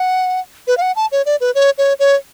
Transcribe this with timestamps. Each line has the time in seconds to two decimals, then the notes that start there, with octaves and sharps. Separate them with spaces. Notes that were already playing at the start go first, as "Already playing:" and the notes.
Already playing: F#5
0.67 B4
0.77 F5
0.82 F#5
0.96 A5
1.12 C#5
1.26 D5
1.41 B4
1.55 C#5
1.78 C#5
2.00 C#5